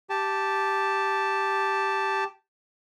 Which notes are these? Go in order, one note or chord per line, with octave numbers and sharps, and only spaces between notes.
G4 A5